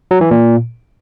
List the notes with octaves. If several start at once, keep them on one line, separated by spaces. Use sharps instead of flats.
F#3
E3
A#2